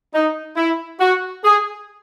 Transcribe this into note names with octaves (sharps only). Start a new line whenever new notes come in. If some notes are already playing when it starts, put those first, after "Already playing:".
D#4
E4
F#4
G#4